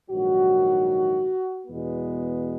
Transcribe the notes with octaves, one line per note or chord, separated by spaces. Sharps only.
A#1 G#2 D#3 F#3 F#4
E2 B2 G#3 B3